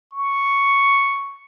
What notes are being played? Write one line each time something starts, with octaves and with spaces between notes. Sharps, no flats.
C#6